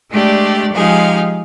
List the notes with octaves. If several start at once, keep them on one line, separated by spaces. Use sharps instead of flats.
G#3 A3 D4 G4 D5
F3 G#3 D#4 G4 G#4 F5